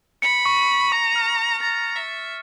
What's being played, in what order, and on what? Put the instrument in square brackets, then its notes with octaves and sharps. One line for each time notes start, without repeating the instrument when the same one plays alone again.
[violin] B5 [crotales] C#7
[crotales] C#6
C#7
[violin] A#5 [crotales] C#6
[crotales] F6
C#6
[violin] A#5 [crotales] A6
[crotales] A6
[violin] E5
[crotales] A6